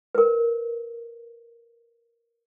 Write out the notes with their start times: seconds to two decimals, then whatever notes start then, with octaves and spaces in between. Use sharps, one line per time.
0.15 A#4 B4